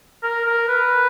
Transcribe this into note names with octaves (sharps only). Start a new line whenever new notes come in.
A#4
A#4
B4